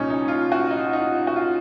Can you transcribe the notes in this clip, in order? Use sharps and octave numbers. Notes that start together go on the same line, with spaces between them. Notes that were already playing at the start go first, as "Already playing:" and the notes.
Already playing: C2 A#2 F3 C#4 D#4
D#4
F4
F#4
D#4
F4
D#4
F4
F#4
F4